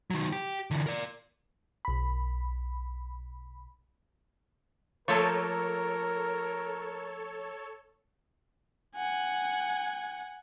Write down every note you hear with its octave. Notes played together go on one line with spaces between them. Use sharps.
D#3 F#3
G4
D3 E3
A#4 D5
B1 B5
F3 A3 A#3 A4 A#4 C#5
F#5 G#5